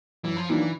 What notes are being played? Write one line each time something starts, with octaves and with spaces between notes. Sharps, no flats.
F#2 E3
F3
D#3 E3 F#3 A#3 D4